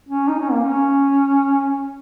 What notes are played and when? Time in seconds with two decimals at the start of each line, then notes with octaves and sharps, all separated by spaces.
0.09 C#4
0.28 D#4
0.40 C#4
0.51 A#3
0.63 C#4